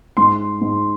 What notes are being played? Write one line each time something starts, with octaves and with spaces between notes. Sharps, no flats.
G#2 C6
G#2